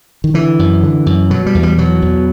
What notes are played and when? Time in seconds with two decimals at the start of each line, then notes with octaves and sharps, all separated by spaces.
0.24 D#3
0.34 D3 E3
0.59 F#2
0.83 D3
1.06 F#2
1.30 B2 F#3
1.46 G3
1.55 E2
1.63 G3
1.78 B2 F#3
2.02 E2